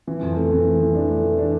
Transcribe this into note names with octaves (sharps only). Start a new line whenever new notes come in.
E3
F2
A3
E3
A3
E3
D4
A3
E3
D4